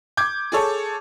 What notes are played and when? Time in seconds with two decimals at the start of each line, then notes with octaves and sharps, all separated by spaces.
0.17 D6 G6 G#6
0.52 G#4 A4 C#5